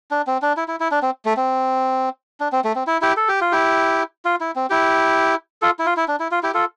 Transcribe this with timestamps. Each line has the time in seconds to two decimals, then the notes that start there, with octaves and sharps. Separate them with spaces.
0.11 D4
0.27 C4
0.42 D4
0.57 E4
0.68 E4
0.80 E4
0.91 D4
1.02 C4
1.25 A3
1.37 C4
2.40 D4
2.52 C4
2.64 A3
2.75 C4
2.87 E4
3.02 E4 G4
3.17 A4
3.28 G4
3.41 F4
3.52 E4 G4
4.25 F4
4.41 E4
4.56 C4
4.70 E4 G4
5.62 F4 A4
5.79 E4
5.86 F4
5.97 E4
6.08 D4
6.20 E4
6.31 F4
6.43 E4 G4
6.54 F4 A4